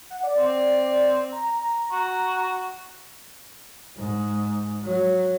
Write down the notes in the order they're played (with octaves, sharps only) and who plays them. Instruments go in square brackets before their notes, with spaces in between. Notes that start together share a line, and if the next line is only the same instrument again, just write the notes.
[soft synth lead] F#5
D5
[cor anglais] C4
[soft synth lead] A#5
[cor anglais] F#4
[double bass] G#2
F#3